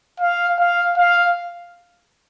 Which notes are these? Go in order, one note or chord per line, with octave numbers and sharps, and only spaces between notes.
F5
F5
F5